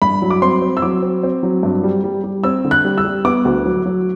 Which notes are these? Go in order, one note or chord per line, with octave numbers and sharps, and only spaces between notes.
G2 B5
F#3
D6
C4 C6
C4
E6
F#3 D6
C4
C4
F#3
G2
G3
G3
G3
C4 E6
D3
F#6
G3
E6
G3
B3 D6
D2
F#3
F#3